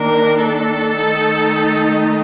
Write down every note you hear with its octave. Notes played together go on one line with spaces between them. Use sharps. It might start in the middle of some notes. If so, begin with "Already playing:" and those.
Already playing: D#3 A#3 D4 A#4
A4
D#3 A3 D#4